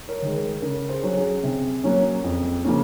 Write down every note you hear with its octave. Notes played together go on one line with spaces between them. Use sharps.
A#4 C#5
D#3 G#3
A#4
C#3 A#4
A#4
G#4 C5
F#3 C#4
G#4
C3
F#3 A#3 C#4
F2
C#3 F3 A#3 C#4